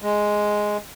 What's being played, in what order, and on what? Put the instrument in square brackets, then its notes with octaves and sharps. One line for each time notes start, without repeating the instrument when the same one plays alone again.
[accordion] G#3